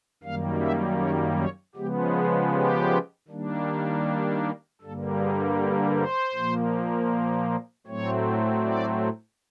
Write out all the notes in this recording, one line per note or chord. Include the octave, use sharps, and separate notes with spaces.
F#2 D#3 G3 A#3 F5
E5
C#5
C#5
C#3 F3 G#3 B3 G4
G#4
G4
D#3 G3 A#3 D4
G4
G2 D3 G3 A#3 A4
G#4
G4
C5
A#2 F3 A#3
A2 F#3 A3 C4 C#5
D5